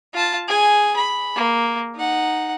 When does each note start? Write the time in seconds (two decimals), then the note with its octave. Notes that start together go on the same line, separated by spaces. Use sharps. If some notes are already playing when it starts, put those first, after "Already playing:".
0.14 F4 A5
0.48 G#4 G#5
0.96 B5
1.36 A#3
1.95 D#4 F#5